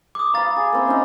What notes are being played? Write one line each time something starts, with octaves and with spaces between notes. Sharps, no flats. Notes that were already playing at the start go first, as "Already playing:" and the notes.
D6 D#6
F5 A#5 B5 A6
G#4
A#3 C4 E4
C#4 D#4